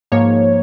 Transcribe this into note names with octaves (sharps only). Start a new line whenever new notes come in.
G#2 F3 A#3 C#5